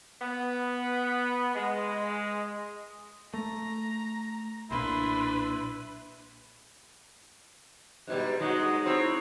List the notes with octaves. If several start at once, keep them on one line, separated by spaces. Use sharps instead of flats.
B3
G#3
A3 A#5
B1 A#2 D4 E4 B4 C6
G#2 B2 G3 F#6
F#3 G#3 D#4 F#4 F#5 D#6
C4 E4 C#5